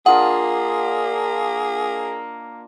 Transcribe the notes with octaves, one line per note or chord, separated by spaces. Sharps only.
A#3 D4 F4 G#4 D#5 F#5